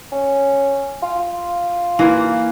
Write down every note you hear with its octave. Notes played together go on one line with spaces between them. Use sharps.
C#4
F4
E3 A#3